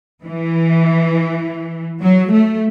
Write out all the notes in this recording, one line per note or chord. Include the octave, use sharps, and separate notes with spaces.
E3
F#3
A3